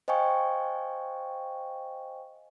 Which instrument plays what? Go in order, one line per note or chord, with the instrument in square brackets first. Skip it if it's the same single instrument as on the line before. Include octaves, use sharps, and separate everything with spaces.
[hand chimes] C5 D#5 F5 G5 G#5 C#6